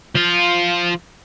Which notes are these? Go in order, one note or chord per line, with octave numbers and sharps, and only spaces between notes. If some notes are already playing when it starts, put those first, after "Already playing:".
F3 F4